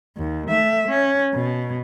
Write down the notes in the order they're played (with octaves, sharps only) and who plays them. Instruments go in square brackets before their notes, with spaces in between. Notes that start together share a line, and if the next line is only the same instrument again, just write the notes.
[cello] D#2
A3 E5
C#4
B2